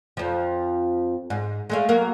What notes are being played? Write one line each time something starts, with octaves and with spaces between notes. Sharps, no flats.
F2 F3
G#2
G#3 A3 F5
F#3 A#3 A#4